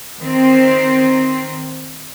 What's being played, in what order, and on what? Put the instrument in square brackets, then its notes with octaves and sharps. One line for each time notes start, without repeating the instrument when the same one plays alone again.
[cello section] D#3 C4